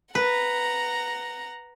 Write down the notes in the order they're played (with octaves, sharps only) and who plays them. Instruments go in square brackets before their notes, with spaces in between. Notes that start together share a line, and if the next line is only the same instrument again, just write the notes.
[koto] B4 [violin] F#5 A#5